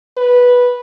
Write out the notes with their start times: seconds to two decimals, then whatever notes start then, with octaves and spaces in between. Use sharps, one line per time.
0.17 B4